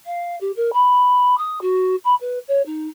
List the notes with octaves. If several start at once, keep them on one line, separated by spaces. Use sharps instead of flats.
F5
G4
A#4
B5
D#6
F#4
B5
B4
C#5
D#4